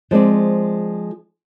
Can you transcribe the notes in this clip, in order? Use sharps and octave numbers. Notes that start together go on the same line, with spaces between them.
F3 G#3 C4 D5